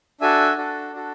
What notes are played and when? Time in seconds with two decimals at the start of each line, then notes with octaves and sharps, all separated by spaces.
0.21 D4 F#4 A4 E5 G#5
0.57 D4 F#4 A4
0.93 D4 F#4 A4